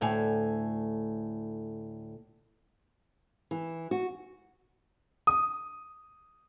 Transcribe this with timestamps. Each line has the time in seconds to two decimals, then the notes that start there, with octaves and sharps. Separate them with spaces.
0.01 D2 A2 G#5
3.51 E3
3.91 F#4
5.27 D#6